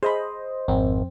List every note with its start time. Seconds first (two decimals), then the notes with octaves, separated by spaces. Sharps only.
0.03 G#4 C5 D#5 B5
0.68 G#1 F2 C4